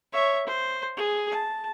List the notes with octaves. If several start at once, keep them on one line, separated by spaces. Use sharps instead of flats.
C#5 E5
C5
G#4
A5